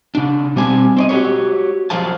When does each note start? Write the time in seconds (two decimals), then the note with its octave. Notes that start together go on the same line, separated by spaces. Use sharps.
0.15 C#3 D4
0.56 B2 G3 C4 G#5 A5
0.97 C4 D5 D#5
1.09 F#4 G4 A4 B4 C#5
1.90 F3 F#3 G#4 C5 F5 A5